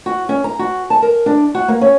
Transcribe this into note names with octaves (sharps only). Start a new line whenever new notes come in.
F#4
C#4
A#5
F#4
A5
A#4
D4
F#4
A#3
C#4